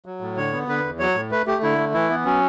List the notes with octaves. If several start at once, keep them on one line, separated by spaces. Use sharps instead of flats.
F#3
A2
D3 C#5
B3
D3 B4
E2
F#3 C#5
A2
A3 B4
A3 G4
D3 E4
A3
E3 E4
B3
F#3 C#4